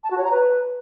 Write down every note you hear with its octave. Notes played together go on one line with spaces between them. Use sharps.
A5
F#4
C#5
A#5
B4